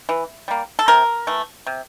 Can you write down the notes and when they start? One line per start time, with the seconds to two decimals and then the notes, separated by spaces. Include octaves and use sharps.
0.09 E3
0.48 G3 A#3
0.79 A4
0.88 C3 A#4
1.27 E3 A3
1.67 C3